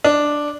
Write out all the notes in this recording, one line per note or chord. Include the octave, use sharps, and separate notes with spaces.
D4